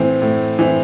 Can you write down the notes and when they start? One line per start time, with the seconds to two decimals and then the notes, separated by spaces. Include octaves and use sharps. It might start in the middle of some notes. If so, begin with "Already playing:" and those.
Already playing: A2 E3 C4
0.22 A2
0.59 E3 C4